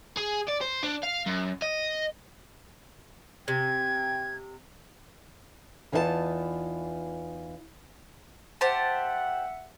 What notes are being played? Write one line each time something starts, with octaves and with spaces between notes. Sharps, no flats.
G#4
D5
C5
D4
F5
F#2
D#5
C3 G5 G#6
E2 E3 D#4 F4 B4 A5
G4 C5 E5 F#5 A5